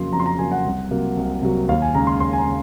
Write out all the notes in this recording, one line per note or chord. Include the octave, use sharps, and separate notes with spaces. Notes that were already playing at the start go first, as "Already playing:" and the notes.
Already playing: F2 C#3 F#3 A#3 C6
F2 A#5
C6
A#5
C#3 F#3 A#3 G#5
F#5
C2
C3 F#3 A#3
C2
C3 F#3 A#3
D#2 F5
G#5
C#3 G#3 A#5
C6
D#2 C6
G#5
A#5
C#3